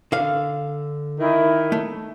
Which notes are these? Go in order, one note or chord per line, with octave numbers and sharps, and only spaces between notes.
D3 F5
D#3 E4
A3